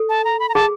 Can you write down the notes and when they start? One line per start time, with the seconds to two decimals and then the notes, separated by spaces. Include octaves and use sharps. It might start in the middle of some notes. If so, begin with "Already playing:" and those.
Already playing: A4
0.09 A5
0.25 A#5
0.40 B5
0.49 A#5
0.54 G#4 A5